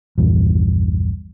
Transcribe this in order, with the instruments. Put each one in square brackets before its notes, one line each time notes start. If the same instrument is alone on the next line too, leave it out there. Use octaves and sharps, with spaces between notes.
[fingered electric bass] A#1 E2 G2